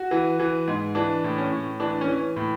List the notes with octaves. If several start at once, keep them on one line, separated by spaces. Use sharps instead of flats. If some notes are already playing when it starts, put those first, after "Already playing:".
Already playing: F#4
E3
E3
G#2
E3 D4
A2
C#4
A2
E3 D4
C#4
E3
A2